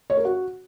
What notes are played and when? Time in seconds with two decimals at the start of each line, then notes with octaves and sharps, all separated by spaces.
0.10 C#5
0.17 A#4
0.25 F#4